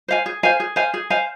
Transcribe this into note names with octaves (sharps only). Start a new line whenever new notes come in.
C5 F5 G#5
G#4
C5 F5 G#5
G#4
C5 F5 G#5
G#4
C5 F5 G#5